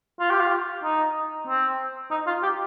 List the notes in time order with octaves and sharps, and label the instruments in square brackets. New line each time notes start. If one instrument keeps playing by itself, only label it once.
[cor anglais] F4
G4
F4
D#4
C4
D#4
F4
G4